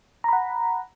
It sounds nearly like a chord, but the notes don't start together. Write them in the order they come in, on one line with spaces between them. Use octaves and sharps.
A#5 B5 F#5